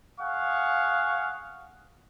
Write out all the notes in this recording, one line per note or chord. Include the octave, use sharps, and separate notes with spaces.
G#4 F5 F#5 C#6